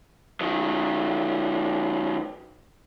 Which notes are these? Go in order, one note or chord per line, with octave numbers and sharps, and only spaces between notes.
D#3 F#3